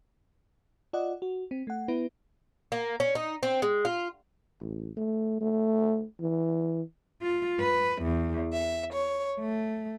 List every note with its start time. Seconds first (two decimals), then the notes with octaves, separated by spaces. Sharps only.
0.93 F4 D5 D#5 F#5
1.22 F#4
1.51 C4
1.67 A3 F#5
1.88 B3 E4 B4
2.72 A#3
3.00 C#4
3.15 D#4
3.43 C4
3.62 G#3
3.85 F4
4.60 A1
4.97 A3
5.41 A3
6.21 E3
7.22 F4
7.60 B4
8.02 E2
8.51 E5
8.91 C#5
9.40 A3